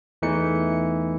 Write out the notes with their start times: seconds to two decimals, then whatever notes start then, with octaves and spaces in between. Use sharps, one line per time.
0.22 E2 E3 A3 D#4 C#7